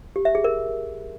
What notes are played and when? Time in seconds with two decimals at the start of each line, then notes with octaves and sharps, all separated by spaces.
0.16 G4
0.25 E5
0.35 G#4
0.44 A#4